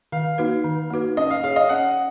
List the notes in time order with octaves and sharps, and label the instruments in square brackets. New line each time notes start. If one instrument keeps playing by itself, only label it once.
[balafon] D#3 [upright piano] F5
[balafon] A#3 D#4 F#4 B4
D#3
A#3 D#4 F#4 B4
[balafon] C#4 [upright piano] D#5
[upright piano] F5
[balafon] G#4 C#5 [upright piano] F5
[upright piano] D#5
[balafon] C#4 [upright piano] F#5